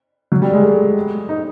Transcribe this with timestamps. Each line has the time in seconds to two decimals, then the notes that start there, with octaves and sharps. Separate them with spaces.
0.32 F#3
0.42 G3
0.53 G#3
0.63 A3
1.29 D#4